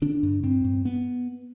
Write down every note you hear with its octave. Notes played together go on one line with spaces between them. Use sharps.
D3 D4
G2
G2 C4
G2
B3